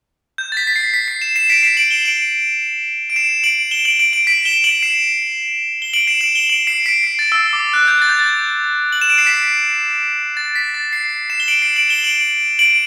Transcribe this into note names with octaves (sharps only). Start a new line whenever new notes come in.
G6
A6
B6
B6
C7
B6
C7
C7 E7
C7 E7
B6 D7
C7 E7
D7 F#7
E7 G7
D7 F#7
D7
C7 E7
D7 F#7
E7 G7
D7 F#7
D7 F#7
D7 F#7
B6 D7
E7 G7
D7 F#7
C7 E7
G7
D7 F#7
C7 E7
D7 F#7
E7 G7
D7 F#7
C7 E7
B6 D7
C7
A6
E6
D6
E6
F#6
G6
A6
G6
A6
F#7
E7
D7
C7
B6
A6
B6
A6
C7
C7 E7
G7
D7 F#7
C7 E7
D7 F#7
E7 G7
D7 F#7
D7 F#7